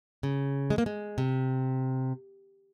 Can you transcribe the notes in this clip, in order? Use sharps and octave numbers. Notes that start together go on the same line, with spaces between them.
C#3
G#3
A#3
G#3
C3